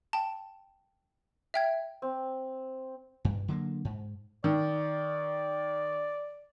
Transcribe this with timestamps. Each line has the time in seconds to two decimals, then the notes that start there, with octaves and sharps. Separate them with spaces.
0.13 G5 A5
1.54 E5 G5 G#6
2.02 C4
3.25 G2
3.48 D3 F#3 G3 A#3
3.85 G#2
4.44 D#3 D5